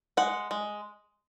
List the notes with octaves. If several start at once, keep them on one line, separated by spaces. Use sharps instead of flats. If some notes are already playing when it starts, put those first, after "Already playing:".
G#3 F#5
G#3